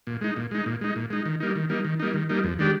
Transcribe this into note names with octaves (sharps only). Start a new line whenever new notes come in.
A#2
G#3 D#4
A#2
G#3 D#4
A#2
G#3 D#4
A#2
G#3 D#4
D#3
G3 A#3 D#4
D#3
G3 A#3 D#4
D#3
G3 A#3 D#4
D#3
G3 A#3 D#4
F2
D#3 G#3 D4 G4